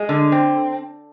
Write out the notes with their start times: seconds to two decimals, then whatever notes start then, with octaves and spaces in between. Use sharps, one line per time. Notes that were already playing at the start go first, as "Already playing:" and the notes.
Already playing: G#3
0.09 D3
0.32 C4